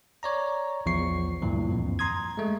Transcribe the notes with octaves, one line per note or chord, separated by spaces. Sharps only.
C#5 D5 A#5
A#1 E2 F3 C#6 C7
D2 G2 A#2 E3
F2
A#5 C6 D#6 G#6
G#3 A3